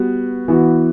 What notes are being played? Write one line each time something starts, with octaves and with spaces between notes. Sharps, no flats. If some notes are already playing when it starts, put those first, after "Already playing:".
Already playing: G3 B3 F#4
E3 B3 F#4